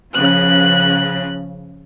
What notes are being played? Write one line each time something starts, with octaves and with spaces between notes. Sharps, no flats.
C#3 F3 F#6